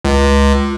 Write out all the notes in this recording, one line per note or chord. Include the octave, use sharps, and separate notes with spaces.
C#2